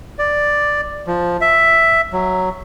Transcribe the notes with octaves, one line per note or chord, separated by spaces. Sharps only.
D5
F3
E5
F#3